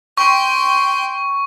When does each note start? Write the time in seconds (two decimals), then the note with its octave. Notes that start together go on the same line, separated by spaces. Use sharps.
0.17 G5 C6 C#6